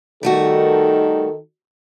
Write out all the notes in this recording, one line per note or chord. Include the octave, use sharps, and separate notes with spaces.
D#3 G3 A3 F#4 A4